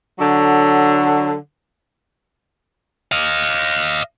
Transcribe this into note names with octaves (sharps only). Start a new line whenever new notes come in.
D3 F#3
D#5 F5